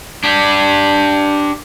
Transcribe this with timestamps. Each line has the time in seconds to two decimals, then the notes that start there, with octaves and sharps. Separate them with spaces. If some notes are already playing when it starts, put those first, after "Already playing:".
0.24 D4 G4